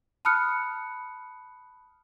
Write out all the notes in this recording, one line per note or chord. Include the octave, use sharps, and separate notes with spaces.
A5 B5 D#6 F6 F#6 C#7